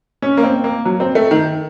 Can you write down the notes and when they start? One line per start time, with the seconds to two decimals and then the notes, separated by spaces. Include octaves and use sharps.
0.22 C#4
0.37 A#3
0.43 C4
0.64 A#3
0.85 F#3
1.00 C4
1.15 A3
1.31 D#3